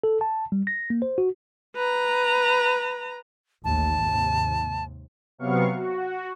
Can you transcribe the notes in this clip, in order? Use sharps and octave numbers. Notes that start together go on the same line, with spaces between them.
A4
A5
G3
A#6
A#3
C5
F#4
B4 A#5
A1 D#2 A5
D#2 G#2 C3
C3 F#3 B3 F5 C#6
F#4